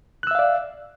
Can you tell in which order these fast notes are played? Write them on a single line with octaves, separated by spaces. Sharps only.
F#6 E6 E5 F5 D5